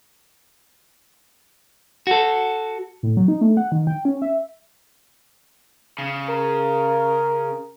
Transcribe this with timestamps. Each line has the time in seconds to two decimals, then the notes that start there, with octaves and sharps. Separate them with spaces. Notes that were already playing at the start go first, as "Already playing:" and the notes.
2.07 F#4 A4
3.03 A2
3.17 F#3
3.28 D#4
3.41 A3
3.57 F#5
3.72 D#3
3.87 G5
4.05 C#4
4.22 E5
5.99 C#3
6.29 A#4